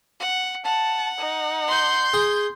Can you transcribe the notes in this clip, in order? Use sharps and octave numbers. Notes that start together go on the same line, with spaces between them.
F#5
F#5 A5
D#4
C6 G6
G#4